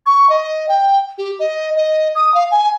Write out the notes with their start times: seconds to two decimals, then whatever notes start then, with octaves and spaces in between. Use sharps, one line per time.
0.06 C#6
0.30 D#5
0.69 G5
1.18 G4
1.40 D#5
1.76 D#5
2.15 D#6
2.34 F5
2.51 G#5